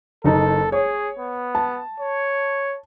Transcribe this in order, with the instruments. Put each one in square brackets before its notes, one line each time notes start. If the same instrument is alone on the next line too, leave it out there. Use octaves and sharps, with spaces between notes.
[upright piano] F#1 D#4 [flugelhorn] A4
[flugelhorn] G#4 [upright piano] C#5
[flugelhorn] B3
[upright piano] A5
[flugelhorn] C#5